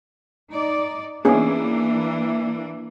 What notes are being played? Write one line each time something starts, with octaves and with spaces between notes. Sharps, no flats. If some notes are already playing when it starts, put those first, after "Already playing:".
D#4 D5
E3 A#3 B3 C#4 D4 G#4